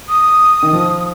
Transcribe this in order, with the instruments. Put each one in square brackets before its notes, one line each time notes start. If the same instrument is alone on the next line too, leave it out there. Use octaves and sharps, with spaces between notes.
[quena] D#6
[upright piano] D#3
F3